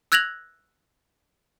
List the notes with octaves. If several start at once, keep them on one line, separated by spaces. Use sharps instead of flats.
E6 F#6 G#6 A#6 F7 F#7